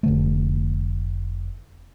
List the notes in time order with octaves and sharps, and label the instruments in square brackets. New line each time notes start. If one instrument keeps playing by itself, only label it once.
[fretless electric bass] F1 D3 A3